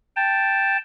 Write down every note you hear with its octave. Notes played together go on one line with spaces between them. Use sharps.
G5 A5